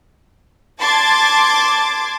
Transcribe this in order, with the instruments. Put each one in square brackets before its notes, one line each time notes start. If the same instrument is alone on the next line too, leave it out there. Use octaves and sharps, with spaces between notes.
[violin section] A5 C6 D6 G#6 A6